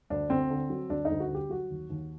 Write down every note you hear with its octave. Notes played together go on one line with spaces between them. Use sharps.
D2 D4
D2 C4
D3
F#3
D2 D4
D#4
D2
F#4
D3 G4
F#3 F#4
D#2
D#2